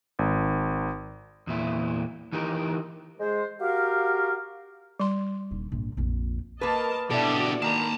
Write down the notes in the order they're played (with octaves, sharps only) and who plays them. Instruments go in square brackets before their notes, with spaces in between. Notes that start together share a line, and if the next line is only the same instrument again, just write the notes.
[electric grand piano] G#1
[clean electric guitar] E2 A#2 E4
E3 D#4 G4 A#4
[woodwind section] G#3 C5
F#4 G4 A#4 F5
[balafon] G3 C6
[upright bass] D#1 D3
A#1 G#2
A#1 F2
[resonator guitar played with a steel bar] A#3 B4 [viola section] A#4 D#5 A5
[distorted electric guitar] B2 G4 [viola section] D4 F#4 D5 [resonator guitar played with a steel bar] E4 A4
[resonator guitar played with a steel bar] D#3 [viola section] A#3 [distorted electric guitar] A5 A#5